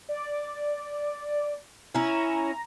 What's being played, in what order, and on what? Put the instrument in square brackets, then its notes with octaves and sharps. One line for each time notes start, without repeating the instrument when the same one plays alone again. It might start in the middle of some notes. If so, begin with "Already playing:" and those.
[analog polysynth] D5
[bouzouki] C#4 E4 [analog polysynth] A#5